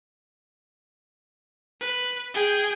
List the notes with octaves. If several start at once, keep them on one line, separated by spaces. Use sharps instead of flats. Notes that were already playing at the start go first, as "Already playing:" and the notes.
B4
G#4 G5